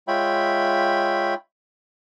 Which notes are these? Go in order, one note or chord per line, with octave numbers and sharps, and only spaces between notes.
G#3 F4 C#5 E5 G5 B5